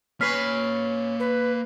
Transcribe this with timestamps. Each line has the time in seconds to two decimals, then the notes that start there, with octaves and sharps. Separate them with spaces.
0.21 A#3 C#4 B4 G#5 F6 B6 C7
1.19 B4